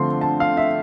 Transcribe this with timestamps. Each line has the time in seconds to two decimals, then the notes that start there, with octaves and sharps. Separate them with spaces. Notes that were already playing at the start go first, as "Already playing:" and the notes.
Already playing: D3 F3 A3 C4 C6
0.21 A5
0.40 F5
0.57 E5